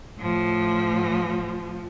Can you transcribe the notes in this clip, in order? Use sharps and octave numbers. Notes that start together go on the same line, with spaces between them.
A2 F3